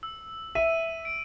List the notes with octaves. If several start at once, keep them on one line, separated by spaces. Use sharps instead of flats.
E6
E5 D#7
D7